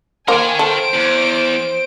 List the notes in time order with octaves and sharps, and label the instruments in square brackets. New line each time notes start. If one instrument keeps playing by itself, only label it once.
[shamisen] A#3 C5 [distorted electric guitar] A#4 G5 [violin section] G#5
[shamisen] A4 [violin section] C5 D7
[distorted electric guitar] E2